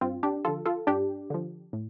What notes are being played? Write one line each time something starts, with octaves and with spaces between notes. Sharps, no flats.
G2 C4 F4
D4 G4
D3 F3 F4 A4
F4 A4
G2 D4 G4
D3 F3
A2